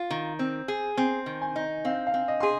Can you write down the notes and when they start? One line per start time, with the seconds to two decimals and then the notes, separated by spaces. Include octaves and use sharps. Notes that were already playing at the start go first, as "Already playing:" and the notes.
Already playing: F4
0.10 D#3 A#5
0.39 C4
0.68 G#4
0.97 C4 G#5
1.26 D#3
1.41 G#5
1.56 D#4
1.85 C4 F5
2.07 F5
2.14 C4
2.28 D#5
2.40 G#4 C6